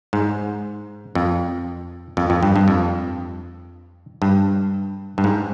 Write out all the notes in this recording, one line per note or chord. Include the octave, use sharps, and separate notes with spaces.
G#2
F2
F2
F2
G2
G2
F2
G2
G2
G#2